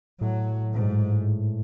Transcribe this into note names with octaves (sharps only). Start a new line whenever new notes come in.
A2 F#3
G#2